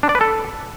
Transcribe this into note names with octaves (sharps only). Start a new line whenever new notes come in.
D4
D5
B4
A4